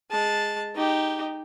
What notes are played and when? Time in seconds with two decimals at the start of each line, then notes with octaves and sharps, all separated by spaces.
0.11 G#3 A5
0.75 D#4 G4